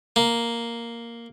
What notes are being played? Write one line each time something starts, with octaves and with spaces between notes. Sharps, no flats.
A#3